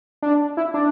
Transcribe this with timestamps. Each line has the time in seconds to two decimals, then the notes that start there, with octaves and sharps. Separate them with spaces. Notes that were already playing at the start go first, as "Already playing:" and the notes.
0.22 D4
0.57 E4
0.74 D4